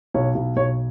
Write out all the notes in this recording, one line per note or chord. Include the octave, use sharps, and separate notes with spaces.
B1 C#5
B1
B1 C#5